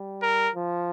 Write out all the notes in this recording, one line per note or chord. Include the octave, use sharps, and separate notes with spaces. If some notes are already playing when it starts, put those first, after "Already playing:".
Already playing: G3
A#4
F3